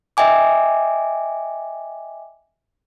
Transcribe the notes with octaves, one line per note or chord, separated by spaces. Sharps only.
D#5 E5 G5 G#5 D6